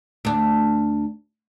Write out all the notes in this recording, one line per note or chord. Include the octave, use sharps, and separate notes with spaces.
D2 D4